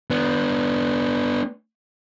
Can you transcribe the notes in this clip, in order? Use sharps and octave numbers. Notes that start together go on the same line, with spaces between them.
B3 D4